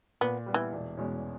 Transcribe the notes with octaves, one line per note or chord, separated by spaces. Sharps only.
A#2 B3
G3 B3
E3
E1
E2 B2 G#3 C#4